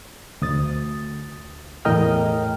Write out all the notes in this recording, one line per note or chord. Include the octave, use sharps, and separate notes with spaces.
D2 D#6 A6
E2 A2 A#4 D#5 G5 F6